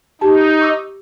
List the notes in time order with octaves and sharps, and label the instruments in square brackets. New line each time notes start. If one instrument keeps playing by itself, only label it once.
[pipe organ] D#4 [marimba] G4 A5
[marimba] C#6 D6 E6